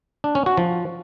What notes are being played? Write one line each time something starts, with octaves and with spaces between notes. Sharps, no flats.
D4
C#4
F#4
F3